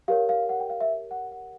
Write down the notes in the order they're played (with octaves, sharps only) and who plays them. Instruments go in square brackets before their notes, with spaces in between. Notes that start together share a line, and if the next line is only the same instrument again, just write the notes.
[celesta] G4 A#4 C#5 F5
F5
F#5
G5
F5
E5
F#5
F#5